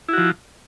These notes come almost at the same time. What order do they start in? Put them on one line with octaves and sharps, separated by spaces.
E4 F#4 F3